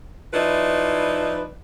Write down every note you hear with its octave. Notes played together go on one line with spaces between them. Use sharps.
F3 D#4 E4 B4 D5